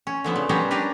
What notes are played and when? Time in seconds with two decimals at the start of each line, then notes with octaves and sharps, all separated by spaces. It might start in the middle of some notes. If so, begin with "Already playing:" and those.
0.07 C#4
0.24 D3 F3 B3
0.36 C#3
0.49 G3 B3 C#4 A#4 C5
0.71 C#4 D4 G4 A#4 B4